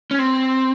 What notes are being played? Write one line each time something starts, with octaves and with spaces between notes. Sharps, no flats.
C#4
C4